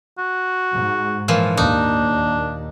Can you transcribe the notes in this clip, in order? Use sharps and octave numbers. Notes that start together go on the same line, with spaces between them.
F#4
G#2
A#2 E3 F3
D#2 D4 D#4